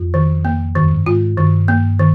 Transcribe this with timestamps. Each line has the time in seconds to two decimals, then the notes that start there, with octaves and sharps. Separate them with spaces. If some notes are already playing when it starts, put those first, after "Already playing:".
Already playing: F2 F4
0.14 D#3
0.45 A#3
0.76 G2 D#3
0.84 F2
0.92 G2
1.06 G#2 F4
1.38 G2 D#3
1.68 A#3
1.99 D#3